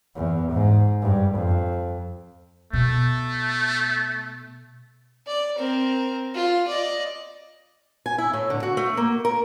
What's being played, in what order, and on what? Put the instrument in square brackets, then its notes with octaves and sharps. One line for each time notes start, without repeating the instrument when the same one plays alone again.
[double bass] E2
G#2
G2
F2
[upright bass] B2 [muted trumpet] A3
[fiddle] D5
C4 A#4
F4
D5 D#5
[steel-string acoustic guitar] G#5
E4
A2
D3
F#4
A3
A#3
A#4